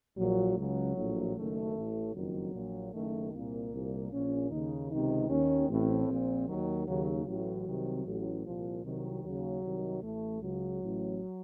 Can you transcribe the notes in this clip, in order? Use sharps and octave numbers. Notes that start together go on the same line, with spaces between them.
A#1 A#2 F#3
C#2 C#3 F#3
A#1 A2
F#1 F#2 D#3 A3
A1 A2
F#1 F2 D#3 F#3
A#1 A#2
F#1 F#2 D#3 A3
C2 A#2 A#3
C2 A#2
A#1 A#2 C#4
D#2 C#3 D#4
C#2 C3 D#3 D#4
D#2 D#3 C#4
A1 A2 C4
A#1 A#2
D#2 D#3 F#3
D#2 C#3 F#3
A1 A2 F#3
C2 C3 D#3
A1 A2
C2 A#2 F3
C2 C3 D#3 F#3
D#2 C#3 F#3
C2 C3 D#3
A1 A2 A3
C#2 C#3 F#3
A1 A2